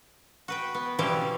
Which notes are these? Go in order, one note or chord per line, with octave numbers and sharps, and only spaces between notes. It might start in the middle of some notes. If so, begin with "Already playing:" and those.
F#4 B4 G5
B3
B2 E3 F3 G3 C#4 D5